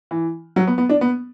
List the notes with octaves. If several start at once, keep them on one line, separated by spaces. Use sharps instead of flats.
E3
F#3
B3
B3
D4
B3